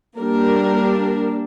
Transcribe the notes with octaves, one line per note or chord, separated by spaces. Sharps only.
G3 A#3 D4 A#4